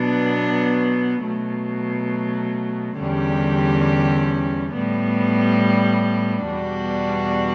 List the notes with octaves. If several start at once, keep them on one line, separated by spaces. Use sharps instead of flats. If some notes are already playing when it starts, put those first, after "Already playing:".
Already playing: B2 F#3 B3 D4
B2 F#3 A3
E2 D3 G3 C#4 G4
A2 G3 B3
E2 B2 G3 D4 F#4